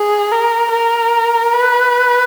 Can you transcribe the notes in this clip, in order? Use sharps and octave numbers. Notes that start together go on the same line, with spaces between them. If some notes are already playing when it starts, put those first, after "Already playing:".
Already playing: G#4
A#4
A#4
B4